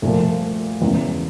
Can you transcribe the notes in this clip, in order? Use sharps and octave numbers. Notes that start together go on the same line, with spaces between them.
C2 A#2 F3 A3
E1 E2 C#3